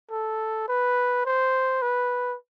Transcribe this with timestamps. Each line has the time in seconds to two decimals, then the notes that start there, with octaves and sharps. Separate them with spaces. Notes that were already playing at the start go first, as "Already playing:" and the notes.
0.11 A4
0.68 B4
1.26 C5
1.82 B4